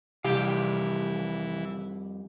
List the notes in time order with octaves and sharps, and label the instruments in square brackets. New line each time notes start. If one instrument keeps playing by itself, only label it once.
[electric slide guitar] F2 G3 F5 [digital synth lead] C3 [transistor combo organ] E3 [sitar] G4